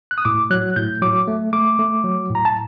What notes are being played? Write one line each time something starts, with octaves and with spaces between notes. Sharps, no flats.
F#6
D#6
A2 D6
F#3 F#6
A2 G6
F#3 D6
A3
A3 D6
A3
F#3
A2
A#5
A5